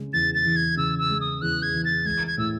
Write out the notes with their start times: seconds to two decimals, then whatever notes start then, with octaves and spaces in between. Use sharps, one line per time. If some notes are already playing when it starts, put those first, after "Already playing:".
Already playing: C#3 G#3
0.13 E2 A6
0.35 A6
0.45 E3
0.56 G#6
0.77 C#3 E6
0.99 E6
1.10 G#3
1.21 D#6
1.41 E2 F#6
1.63 G#6
1.74 E3
1.85 A6
2.05 G#3 G#6
2.27 G#6
2.38 A2 E6